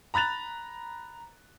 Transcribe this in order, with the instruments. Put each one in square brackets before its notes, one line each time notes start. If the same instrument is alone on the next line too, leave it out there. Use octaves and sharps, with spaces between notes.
[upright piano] A#5 B5 F#6 A6 F7